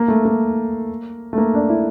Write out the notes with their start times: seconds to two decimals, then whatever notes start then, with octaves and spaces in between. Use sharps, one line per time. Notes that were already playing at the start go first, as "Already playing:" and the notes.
Already playing: A#3
0.08 A3
0.25 A#3
1.33 A3
1.38 A#3
1.54 D4
1.69 E4